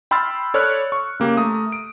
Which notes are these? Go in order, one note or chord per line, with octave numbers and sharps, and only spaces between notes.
G5 B5 C6 E6 F6 A6
A4 C#5 D5 B5 F6 F#6
C#6
C#3 A#3 G4
A3 A#5 D#6
D7